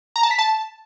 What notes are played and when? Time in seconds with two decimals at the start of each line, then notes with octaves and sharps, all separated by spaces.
0.16 A#5
0.23 A5
0.31 B6
0.39 A5